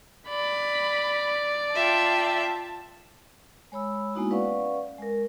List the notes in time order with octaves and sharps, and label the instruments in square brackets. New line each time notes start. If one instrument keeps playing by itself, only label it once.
[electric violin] D5 [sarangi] B5
[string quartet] F4 E5 G5 [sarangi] A5
[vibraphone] G#3 C#5 B5 E6
G#3 A#3 B3 D#4 E4 F#4
C#4 B4 D5 F5 F#5 C#6
G#3 A#4